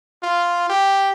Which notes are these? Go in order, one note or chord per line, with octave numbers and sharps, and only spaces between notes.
F4
G4